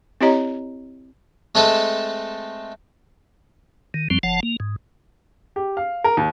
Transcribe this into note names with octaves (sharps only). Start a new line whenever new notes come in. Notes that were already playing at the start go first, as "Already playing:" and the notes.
C4 E4 G4 C#5 D#5 A#5
G#3 A3 C4 A4 B4 A5
D#3
F#2 F3 G3 C4
F#1 F3 F#5 A5
A#3
G#2
G4
F5
A#4
D#2